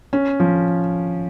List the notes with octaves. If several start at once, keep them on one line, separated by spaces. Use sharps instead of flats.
C#4
F3